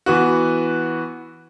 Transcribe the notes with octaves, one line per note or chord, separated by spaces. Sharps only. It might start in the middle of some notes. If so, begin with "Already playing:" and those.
E3 B3 F#4